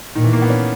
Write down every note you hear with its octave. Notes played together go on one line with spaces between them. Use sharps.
A#2 D#3
E3
A#3
B3
C#4